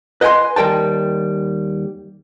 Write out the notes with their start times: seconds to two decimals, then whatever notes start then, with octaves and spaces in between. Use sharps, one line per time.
0.21 B4 D#5 F5 G5 G#5 C6
0.56 D#2 G3 A#4 G5 A5